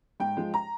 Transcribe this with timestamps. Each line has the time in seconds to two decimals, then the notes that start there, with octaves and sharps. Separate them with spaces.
0.20 G#2 G5
0.37 F3 G#3
0.54 A#5